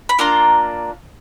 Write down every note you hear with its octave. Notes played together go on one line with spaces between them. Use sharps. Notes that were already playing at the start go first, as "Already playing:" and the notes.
B5
A#3 D4 F4 A#5 C6